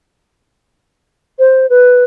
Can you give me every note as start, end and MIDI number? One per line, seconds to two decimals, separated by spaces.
1.39 1.67 72
1.70 2.04 71